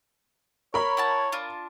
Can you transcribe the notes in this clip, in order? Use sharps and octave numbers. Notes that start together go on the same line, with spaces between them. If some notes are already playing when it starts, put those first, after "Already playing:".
A#4 C#5 B5
E4 F#5 A5
D4 F4